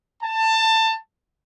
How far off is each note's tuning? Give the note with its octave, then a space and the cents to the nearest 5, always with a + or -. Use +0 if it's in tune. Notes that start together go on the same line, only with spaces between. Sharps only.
A5 +20